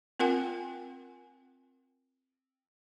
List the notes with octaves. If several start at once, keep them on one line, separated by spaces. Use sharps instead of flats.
C4 F4 A#4 F#5 G#5